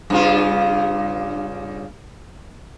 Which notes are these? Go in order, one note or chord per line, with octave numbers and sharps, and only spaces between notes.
G2 C#3 F4